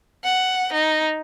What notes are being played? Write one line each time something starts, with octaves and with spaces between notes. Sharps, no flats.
F#5
D#4